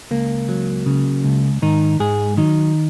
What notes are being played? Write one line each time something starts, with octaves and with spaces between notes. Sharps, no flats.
C#2 A#3
F#3
C#3
C#2
G#2 D#3 D#4
G#2 G#3 G#4
D#3 F#3 D#4